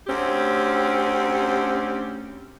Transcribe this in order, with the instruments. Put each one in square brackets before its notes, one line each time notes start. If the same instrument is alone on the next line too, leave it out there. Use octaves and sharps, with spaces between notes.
[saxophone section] D2 C4 C#4 G4